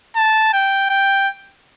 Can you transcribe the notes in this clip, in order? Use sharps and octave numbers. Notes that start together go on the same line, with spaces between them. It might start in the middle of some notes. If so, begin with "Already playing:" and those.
A5
G5
G5